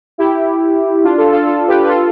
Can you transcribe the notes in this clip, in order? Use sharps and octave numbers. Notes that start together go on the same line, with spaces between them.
E4 G4
D4 F4
F4 A4
F4 A4
F4 A4
G4 B4
B4
F4 A4